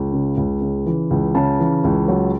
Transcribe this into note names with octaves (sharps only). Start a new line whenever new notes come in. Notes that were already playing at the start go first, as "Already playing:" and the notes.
Already playing: C#2
C#3
C#2
C#3
E3
C#2
C#3 A5
E3
C#2
F#3